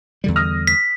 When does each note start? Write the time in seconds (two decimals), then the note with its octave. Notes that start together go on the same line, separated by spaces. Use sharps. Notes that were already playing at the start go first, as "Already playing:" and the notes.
0.24 E2 D3 G3
0.36 D#6 F6 A#6
0.67 B6